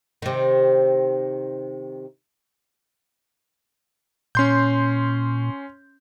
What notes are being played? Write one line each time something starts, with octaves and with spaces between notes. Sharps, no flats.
C3 D#3
A#2 C#4 C6 G6